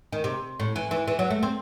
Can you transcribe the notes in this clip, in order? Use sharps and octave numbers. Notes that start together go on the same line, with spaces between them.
D#3
C3
A2
E3
E3
E3
F#3
A3
C4